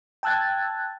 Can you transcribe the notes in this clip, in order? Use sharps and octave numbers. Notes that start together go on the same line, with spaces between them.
G5 A5 E6 F#6 G#6 A6